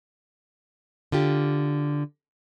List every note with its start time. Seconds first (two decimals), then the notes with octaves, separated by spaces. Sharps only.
1.12 D3 F4 G4